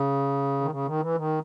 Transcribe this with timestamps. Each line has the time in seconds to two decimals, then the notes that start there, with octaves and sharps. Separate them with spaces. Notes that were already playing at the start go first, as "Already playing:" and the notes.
Already playing: C#3
0.61 D#3
0.71 C#3
0.85 D#3
1.00 E3
1.16 D#3